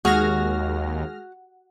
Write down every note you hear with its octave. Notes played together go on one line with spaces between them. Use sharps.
D#2 G#3 F#4 G#4 F6 A#6